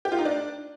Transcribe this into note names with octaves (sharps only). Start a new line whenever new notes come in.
G4
F4
D#4
D4